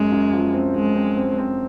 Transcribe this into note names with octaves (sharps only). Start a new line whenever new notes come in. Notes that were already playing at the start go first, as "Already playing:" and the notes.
Already playing: F#2 G#3
F#2
F3
C4
F#2 G#3
C4
C4
C4